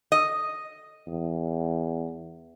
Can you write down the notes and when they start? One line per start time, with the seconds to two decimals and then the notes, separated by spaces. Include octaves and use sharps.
0.12 D#5
1.08 E2